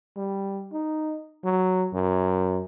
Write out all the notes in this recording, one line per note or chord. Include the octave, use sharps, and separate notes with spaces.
G3
D#4
F#3
F#2